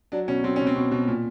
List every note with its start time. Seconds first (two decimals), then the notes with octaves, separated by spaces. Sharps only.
0.12 F#3 D4
0.28 B2 C#4
0.44 F#3 C4
0.56 B2 C#4
0.67 C4
0.76 B2
0.91 B2
1.08 A#2